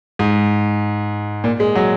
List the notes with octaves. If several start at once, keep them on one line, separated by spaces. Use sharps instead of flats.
G#2
A#2
G#3
F#3